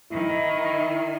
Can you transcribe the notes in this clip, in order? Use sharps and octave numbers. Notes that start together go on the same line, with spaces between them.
D#3 E4